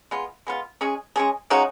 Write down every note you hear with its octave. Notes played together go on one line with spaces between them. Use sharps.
G#3 B3 F4
G#3 B3 F4
G#3 C#4 G#4
G#3 C#4 G#4
C#3 G#3 D#4 F#4